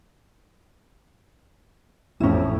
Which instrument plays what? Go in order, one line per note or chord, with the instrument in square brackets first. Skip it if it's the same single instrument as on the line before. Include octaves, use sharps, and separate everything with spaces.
[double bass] A1 F2 [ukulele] C#4 E4